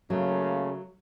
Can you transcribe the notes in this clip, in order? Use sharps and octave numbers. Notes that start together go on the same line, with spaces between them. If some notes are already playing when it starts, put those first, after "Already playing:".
C#3 F#3 A3 A#3